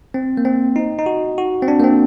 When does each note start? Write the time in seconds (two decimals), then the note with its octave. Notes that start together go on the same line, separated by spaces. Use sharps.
0.14 C4
0.37 A#3
0.45 C4
0.76 D#4
0.98 D#4
1.06 F#4
1.38 F#4
1.63 C4
1.68 D4
1.80 A#3
1.84 C4